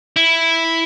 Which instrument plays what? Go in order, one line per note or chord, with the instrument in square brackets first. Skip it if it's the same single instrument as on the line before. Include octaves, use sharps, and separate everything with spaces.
[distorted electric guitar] E4